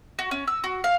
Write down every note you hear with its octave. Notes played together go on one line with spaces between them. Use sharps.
F#4
C#4
E6
F#4
F5